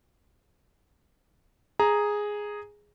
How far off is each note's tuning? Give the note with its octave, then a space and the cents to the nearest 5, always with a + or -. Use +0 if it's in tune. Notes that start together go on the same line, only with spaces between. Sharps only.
G#4 +0 A#5 +0